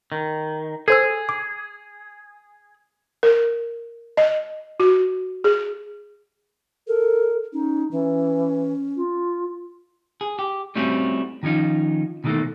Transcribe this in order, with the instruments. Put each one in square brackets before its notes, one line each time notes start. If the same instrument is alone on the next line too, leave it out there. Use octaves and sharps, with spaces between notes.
[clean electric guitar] D#3
[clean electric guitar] G#4 [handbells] A4 C5 E6
[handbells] D6
[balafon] A#4
D#5
F#4
G#4
[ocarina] A4 [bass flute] A#4
[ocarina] C#4 [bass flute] D#4
[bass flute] E3 [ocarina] C#4
[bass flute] F4
[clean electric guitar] G#4
G4
G3 A3 C4 C#4 E4 F#4
D#3 F3 C#4 D#4 F4
B2 D#3 E3 F#3 A3 A#3